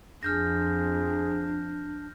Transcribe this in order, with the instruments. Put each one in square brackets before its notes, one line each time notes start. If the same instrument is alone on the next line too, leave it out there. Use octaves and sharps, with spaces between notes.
[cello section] F2 [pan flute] D4 [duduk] G#4 [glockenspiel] F6 G6 A#6